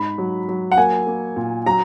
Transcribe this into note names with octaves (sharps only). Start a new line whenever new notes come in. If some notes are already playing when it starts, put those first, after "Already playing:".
Already playing: G#2 B5
F#3
F#3
F#5
A#3 G#5
A#3
A#2
F#3 A#5